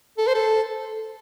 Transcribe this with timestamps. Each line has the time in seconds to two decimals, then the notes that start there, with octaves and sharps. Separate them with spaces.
0.18 A4
0.27 C5
0.35 A4